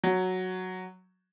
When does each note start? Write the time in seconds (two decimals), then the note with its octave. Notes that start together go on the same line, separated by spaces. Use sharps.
0.04 F#3